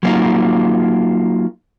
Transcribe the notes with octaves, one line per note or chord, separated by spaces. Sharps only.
F#3 A#3 C#4 D#4 F4